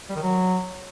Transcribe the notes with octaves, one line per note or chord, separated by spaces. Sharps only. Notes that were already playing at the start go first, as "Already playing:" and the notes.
G3
D#3
F#3